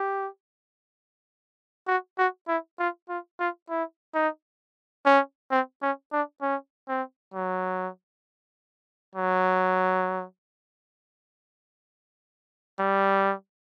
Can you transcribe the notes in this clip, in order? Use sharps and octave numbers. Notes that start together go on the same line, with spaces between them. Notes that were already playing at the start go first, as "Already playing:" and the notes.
Already playing: G4
F#4
F#4
E4
F4
F4
F4
E4
D#4
C#4
C4
C#4
D4
C#4
C4
F#3
F#3
G3